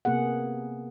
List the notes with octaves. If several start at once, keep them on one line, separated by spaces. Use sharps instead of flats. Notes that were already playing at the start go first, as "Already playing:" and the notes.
C3 A#3 B3 G#4 F#5